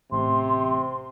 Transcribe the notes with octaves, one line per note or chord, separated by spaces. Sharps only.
A1 C3 C6